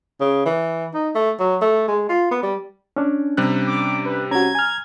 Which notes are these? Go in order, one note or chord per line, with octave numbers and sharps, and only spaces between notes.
C#3
E3
D#4
A3
F#3
A3
G#3
F4
B3
G3
C#4 D4
C3 G3 F#6
D6
B4
C#4 F#4 A#5 G#6
G#5 F6